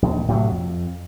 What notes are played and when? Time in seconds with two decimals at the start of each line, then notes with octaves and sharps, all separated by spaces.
0.02 A#1 D#2
0.28 A2 C3 D#3 F#3
0.52 F2